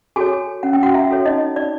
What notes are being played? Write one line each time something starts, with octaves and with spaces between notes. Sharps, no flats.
F#4 G#4 A4 C#5 G#5
C#4 F#5
G5
F#4 F#5
E4 E5
F#4 A4 C#5
D#4 D#5
D#4 D5